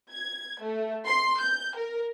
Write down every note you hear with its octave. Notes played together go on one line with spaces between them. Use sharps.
G#6
A3
C6
G6
A#4